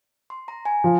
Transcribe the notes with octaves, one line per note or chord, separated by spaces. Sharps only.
C6
A#5
G#5
F3